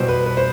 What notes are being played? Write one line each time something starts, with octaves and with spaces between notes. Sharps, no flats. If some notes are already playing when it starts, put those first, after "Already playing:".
Already playing: B2 G3 C5
B4
B4
C5